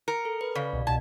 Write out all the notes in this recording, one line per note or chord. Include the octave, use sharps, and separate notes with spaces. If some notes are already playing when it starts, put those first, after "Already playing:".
A#4 C#7
A4
B4
C#3 D5 F5
C2 B2
C2 B2 A5 G#6